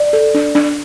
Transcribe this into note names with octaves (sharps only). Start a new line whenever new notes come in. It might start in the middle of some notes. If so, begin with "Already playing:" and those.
Already playing: D5
A4
D4
D4